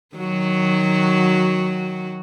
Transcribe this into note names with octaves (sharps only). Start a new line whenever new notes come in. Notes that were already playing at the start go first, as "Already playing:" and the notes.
D#3 F#3 F#4